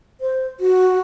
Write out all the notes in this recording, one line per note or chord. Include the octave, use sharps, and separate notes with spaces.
C5
F#4